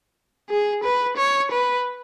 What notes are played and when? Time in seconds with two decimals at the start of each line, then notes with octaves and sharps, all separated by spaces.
0.50 G#4
0.84 B4
1.17 C#5
1.52 B4